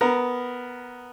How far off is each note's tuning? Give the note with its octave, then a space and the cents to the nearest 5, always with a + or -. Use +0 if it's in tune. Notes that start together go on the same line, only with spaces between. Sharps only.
B3 +0 A#4 +0 A#5 +25